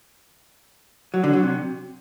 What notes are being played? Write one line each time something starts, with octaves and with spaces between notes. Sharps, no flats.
F#3
D3
F#3
C3